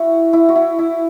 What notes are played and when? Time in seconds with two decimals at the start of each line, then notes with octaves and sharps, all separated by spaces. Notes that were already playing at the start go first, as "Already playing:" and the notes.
Already playing: E4 F#4
0.33 E4
0.49 F#4
0.56 E4
0.79 E4